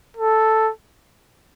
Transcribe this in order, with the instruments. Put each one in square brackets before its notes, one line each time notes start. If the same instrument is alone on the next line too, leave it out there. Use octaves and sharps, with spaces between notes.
[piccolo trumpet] A4